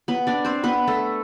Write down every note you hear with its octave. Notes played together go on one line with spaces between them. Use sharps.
B3 B4
D4 D5
C4 C5
B3 B4
A3 A4